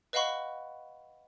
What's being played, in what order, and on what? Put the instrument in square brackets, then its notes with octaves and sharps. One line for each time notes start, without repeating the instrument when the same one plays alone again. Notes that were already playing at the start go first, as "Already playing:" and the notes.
[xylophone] B4 D#5 F5 F#5 B5 C#6